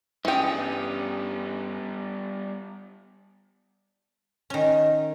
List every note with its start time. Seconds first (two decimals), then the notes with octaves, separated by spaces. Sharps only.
0.25 G2 E3 C#4 G#4 G5
0.49 G3 B3
4.50 D#3 C#4